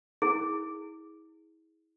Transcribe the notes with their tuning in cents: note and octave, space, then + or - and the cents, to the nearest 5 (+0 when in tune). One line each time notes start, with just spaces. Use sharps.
E4 -35 G#4 +0